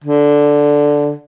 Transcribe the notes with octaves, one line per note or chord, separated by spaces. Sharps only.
D3